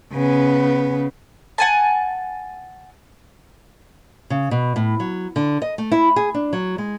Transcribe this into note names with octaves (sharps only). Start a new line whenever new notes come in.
C#3 B3
F#5 G#5 A5
C#3
B2
A2
F#3
D3
D#5
A3
E4
G#4
D4
F#3
G#3